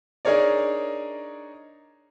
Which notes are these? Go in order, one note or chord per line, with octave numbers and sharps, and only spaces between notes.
D4 D#4 G#4 A#4 C#5 D5